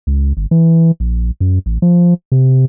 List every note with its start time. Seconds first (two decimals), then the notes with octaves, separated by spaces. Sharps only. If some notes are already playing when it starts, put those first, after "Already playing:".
0.07 C#2
0.37 G1
0.51 E3
1.00 A#1
1.41 F#2
1.66 A1
1.82 F3
2.32 C3